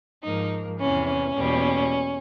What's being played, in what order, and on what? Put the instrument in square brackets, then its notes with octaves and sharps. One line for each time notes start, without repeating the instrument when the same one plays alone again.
[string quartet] G#2 F3 A#3 D#4
E2 C3 E3 C#4
C#4
E2 B2 G3 A#3